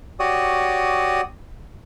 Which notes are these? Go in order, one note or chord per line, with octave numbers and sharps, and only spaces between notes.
F#4 G4 C#5 D5 D#6